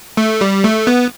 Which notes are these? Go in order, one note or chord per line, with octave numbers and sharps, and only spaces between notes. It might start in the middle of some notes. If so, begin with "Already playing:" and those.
A3
G3
A3
B3